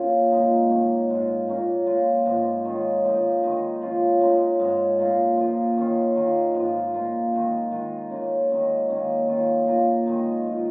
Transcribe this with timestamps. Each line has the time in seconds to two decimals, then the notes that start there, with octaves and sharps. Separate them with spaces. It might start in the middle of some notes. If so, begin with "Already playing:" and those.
Already playing: A#2 C#3 F3 A#3 C#4 F4
0.31 A#2 G#3 D#4
0.70 D#3 A#3 C#4
1.09 G#2 G#3 F4
1.48 A#2 A#3 C#4
1.86 A#2 G#3 F4
2.25 G#2 F3 G#3
2.65 D#3 C#4 F4
3.04 F3 A#3 D#4
3.43 D#3 G#3 D#4
3.82 F3 C#4 F4
4.21 C#3 G#3 D#4
4.60 G#2 G#3 C#4
4.99 A#2 A#3 F4
5.37 F3 A#3 F4
5.77 D#3 C#4 F4
6.15 D#3 A#3 F4
6.55 G#2 F3 G#3 F4
6.94 A#2 A#3 F4
7.33 D#3 G#3 D#4
7.71 D#3 G#3 F4
8.10 C#3 A#3 F4
8.50 D#3 G#3 C#4
8.89 D#3 A#3 C#4
9.28 D#3 C#4 F4
9.66 A#2 A#3 F4
10.06 D#3 G#3 D#4
10.45 F3 G#3 F4